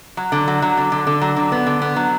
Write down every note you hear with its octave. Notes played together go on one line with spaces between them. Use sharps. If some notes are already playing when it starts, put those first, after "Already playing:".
F#3
D3
F#3
F#3
D3
D3
D3
F#3
D3
B3
D3
B3
F#3